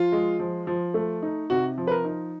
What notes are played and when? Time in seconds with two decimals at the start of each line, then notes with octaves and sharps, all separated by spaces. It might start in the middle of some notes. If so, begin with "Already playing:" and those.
Already playing: F3 F4
0.12 G#3
0.39 F3
0.67 F3
0.94 A3
1.23 D#4
1.50 C3 F#4
1.78 F3
1.87 B4
1.91 A#4
2.05 D#4